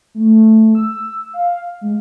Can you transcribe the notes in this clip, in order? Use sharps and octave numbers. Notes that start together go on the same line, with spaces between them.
A3
E6
F5
G#3